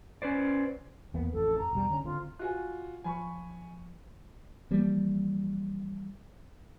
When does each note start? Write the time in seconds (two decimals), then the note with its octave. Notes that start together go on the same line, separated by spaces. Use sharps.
0.22 C#4 B4 C5 D5
1.14 E2 A#3 B3
1.33 A1 F2 A4
1.58 A#5
1.73 E1 G3
1.90 D3 C#4
2.04 D3 C4 F4
2.39 F4 F#4 G#5 F#6
3.04 F3 G#5 B5 C#6
4.71 E3 F3 G3 A#3